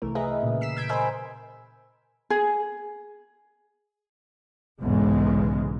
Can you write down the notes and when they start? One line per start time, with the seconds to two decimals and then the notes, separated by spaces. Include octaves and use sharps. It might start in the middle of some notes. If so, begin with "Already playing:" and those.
0.02 C2 E3 A3 A#4
0.15 G#4 A#4 B4 D#5 E5
0.43 A#2 C#3
0.61 E6 B6 C7 E7
0.77 E6 G6 G#6 B6 D7
0.89 A#4 C5 D#5 G#5 B5 E6
2.30 G#4
4.82 B1 E2 G#2 C#3 G#3